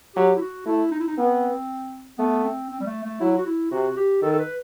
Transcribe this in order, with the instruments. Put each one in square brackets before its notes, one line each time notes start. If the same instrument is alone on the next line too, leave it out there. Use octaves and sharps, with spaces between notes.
[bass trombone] F#3 [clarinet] G4
[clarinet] E4
F#4
[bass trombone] A3 [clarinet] E4
[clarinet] D#4
E4
D#4
[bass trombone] B3 [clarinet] C4
[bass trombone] A3 [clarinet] B3
[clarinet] C4
C4
G3
A3
A3
[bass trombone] F#3 [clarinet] E4
[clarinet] F#4
E4
[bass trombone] C3 [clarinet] F#4
[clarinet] G4
[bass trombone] D#3 [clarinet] A4
[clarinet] A4
B4